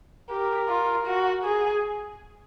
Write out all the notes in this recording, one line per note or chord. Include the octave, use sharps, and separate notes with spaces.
G4 A#4
F4
F#4
G#4